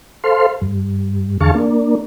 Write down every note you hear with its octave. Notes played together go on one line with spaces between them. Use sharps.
A4 C5 F5 C6
G2
E2 D3 G#4 F5 A5 C#6
A#3 D4